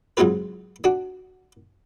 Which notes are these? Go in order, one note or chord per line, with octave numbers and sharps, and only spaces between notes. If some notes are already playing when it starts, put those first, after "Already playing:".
C#2 G#2 F#3 C4 F4 B4
D4 F#4